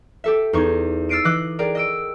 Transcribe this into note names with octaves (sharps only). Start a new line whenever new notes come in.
G4 A4 E5
E2 D#4 C#6 G#6
E6 F6 A6 C7 D7 D#7
E3 D#5 D6 F#6
G#4 A#4 D5 G5
D#5 E6 D7